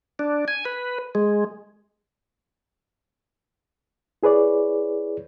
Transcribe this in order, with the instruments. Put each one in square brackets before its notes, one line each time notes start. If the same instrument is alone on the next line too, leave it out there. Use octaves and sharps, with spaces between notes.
[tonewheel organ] D4
G#5
B4
G#3
[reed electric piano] E4 G#4 B4 C#5 D5